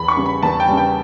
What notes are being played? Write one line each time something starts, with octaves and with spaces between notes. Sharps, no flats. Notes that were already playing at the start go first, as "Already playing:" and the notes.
Already playing: E2 B5
C#6
C#3 G3
B5
E2 A5
G5
C#3 G3
G5